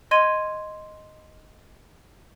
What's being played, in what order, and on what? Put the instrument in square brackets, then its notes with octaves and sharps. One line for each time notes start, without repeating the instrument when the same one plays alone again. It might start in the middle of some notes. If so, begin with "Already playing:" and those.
[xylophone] D#5 C6 G#6 D#7